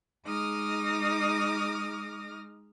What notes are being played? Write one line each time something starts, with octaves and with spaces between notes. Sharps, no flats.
G#3 D#4 D6 D#6 F6 A#6